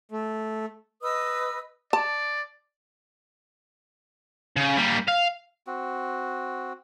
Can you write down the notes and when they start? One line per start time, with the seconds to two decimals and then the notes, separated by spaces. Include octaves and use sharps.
0.11 A3
1.02 B4 D#5 D#6 E6
1.93 D5 A5
4.56 C#3
4.77 G3 A#3
5.08 F5
5.67 C4 F#4